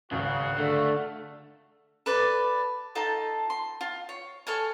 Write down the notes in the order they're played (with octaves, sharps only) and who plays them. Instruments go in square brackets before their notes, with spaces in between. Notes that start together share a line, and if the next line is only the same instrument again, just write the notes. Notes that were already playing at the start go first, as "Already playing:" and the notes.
[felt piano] G#1 C#2 [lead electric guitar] C#3 [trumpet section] F#4 F5 F#5
[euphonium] D3 [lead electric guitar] A3
[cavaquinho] A4 B4 D5
D#4 F4 A4 A5
C6
F4
C#5
A4 C#5 F5 G#5